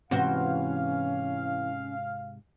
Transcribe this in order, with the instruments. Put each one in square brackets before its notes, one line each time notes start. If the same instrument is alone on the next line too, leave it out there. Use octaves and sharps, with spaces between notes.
[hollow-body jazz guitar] G#2 C3 [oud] E3 F#4 C5 [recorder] C#4 [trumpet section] F5